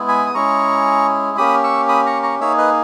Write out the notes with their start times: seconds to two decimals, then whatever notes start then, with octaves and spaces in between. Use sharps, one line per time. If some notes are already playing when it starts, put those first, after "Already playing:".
Already playing: G#3 B3 E4 G#4
0.08 G#5 B5
0.26 D#6
0.34 G#3 C#4 E4 G#4 A#5 C#6
1.37 A#3 C#4 G4 B5 D#6
1.63 C#6 E6
1.88 B5 D#6
2.06 A#5 C#6
2.23 A#5 C#6
2.40 A#3 D#4 G#4 C#5 E5
2.58 B4 D#5